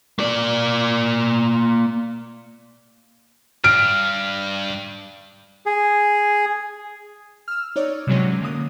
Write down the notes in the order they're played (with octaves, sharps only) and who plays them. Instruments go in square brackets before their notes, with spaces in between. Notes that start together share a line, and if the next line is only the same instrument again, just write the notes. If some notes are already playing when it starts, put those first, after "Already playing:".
[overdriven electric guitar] A#3 D5
[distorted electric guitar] G2 [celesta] F6 [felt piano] D7
[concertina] G#4
[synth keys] E6 F6
D#4 C#5 D5
C3 E3 F#3 G#3 C#4
D3 A#3 D#6